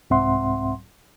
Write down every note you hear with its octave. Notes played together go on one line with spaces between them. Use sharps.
C2 G#2 C4 E5 F#5 C6